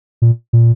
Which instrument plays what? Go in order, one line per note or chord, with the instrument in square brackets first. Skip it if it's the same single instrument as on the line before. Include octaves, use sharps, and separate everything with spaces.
[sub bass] A#2
A#2